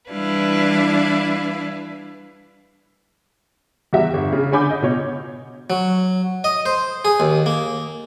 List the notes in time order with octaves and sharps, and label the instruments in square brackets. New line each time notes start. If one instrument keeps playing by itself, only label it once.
[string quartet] E3 G3 D4 E4 B4 F5
[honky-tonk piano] E2 G3 F#4 E5
G1
C#3
D3 C#5 G#5 B5 D6 G6
D#5
B2 C#5
[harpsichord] F#3
D#5
C5
G#4
D#2
A#3